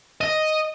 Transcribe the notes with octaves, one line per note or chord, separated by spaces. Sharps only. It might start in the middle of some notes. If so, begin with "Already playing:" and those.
D#5